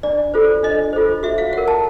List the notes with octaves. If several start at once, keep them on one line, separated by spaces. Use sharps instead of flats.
D4 D5
F4 A4 C5
D4 D#5
F4 A4 C5
F#4 E5
F5
A#4 C#5 F#5
A5